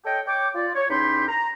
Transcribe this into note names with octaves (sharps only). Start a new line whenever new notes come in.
A4 C#5 D#5 G5
C#5 G5 D6
F4 D5
C#5
E2 C#4 D#4 G4 B5 C6
A#5